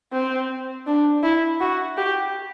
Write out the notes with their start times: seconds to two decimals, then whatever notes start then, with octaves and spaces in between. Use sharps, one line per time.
0.13 C4
0.87 D4
1.23 E4
1.60 F#4
1.97 G4